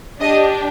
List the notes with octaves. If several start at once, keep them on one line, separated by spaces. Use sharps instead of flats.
D4 G4 D#5